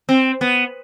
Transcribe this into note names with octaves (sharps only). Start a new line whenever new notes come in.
C4
B3